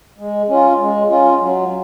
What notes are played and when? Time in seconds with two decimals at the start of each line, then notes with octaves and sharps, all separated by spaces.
0.18 G#3
0.49 C#4 F4
0.79 G#3
1.10 C#4 F4
1.39 F#3